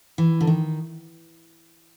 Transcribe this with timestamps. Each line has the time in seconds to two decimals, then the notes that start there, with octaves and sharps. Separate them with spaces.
0.18 E3
0.41 D3
0.47 D#3